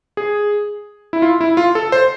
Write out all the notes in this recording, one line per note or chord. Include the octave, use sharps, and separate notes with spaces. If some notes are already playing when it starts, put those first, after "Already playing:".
G#4
E4
F4
E4
F4
A4
C5